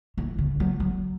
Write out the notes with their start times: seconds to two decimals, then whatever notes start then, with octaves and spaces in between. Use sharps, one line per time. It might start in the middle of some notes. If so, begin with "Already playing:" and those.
0.17 E3
0.38 C#3
0.60 F#3
0.80 F#3